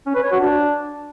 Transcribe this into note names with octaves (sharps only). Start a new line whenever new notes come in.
C#4
B4
C#5
F#4
D4